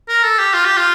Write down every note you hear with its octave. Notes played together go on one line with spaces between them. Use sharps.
A#4
A4
G4
F4
G4
F4